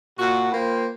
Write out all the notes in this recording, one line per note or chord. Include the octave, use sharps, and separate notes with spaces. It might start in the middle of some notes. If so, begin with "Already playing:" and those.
A#2 F#4
A#3 F4 B4 C5 G5